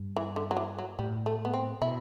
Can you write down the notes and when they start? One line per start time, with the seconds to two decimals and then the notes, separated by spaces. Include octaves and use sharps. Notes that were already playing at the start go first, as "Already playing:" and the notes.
Already playing: G2
0.16 E3
0.36 D3
0.51 F#3
0.57 E3
0.78 F#3
0.99 A2 G3
1.26 A3
1.45 B3
1.54 C4
1.81 B2 E4